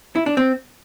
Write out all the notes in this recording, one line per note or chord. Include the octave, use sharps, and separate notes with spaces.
E4
D4
C4